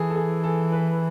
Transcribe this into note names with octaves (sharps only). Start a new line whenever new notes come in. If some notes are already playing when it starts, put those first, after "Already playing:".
Already playing: E3 G#4 A4
A4
G#4
A4
B4